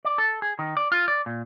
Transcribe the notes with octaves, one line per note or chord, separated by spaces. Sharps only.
D5
A4
G#4
D#3
D5
F4
D5
A#2